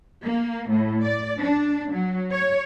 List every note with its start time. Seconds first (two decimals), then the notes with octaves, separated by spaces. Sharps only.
0.25 A#3
0.69 A2
1.03 D5
1.39 D4
1.91 F#3
2.32 C#5